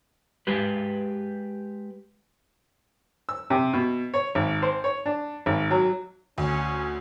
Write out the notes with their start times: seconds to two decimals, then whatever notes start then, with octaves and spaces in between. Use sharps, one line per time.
0.47 G#3 G4 B4
3.29 E6
3.50 C3
3.73 B2
4.14 C#5
4.35 G#1
4.62 C5
4.84 C#5
5.06 D4
5.46 G#1
5.71 F#3
6.38 D2 C#4